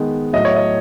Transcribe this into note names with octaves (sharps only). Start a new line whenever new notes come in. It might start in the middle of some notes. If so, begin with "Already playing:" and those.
Already playing: D#3 G#3 B3
A2 F#3 A3 D#5
C#5
D#5